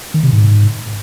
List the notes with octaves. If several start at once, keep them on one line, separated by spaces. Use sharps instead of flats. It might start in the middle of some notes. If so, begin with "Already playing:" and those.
D#3
C3
G#2